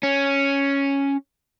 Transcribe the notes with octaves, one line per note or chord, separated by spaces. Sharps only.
C#4